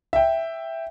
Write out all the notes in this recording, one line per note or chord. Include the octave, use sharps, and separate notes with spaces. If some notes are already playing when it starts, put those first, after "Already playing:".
E5 G5